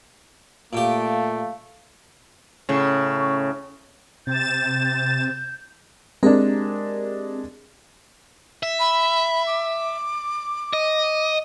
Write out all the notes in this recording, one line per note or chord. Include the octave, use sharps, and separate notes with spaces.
A#2 A3 G4 F5
A2 C#3
C3 G6 A6 E7
G#3 C4 D4 G4 A#4
E5
B5
D6
D#5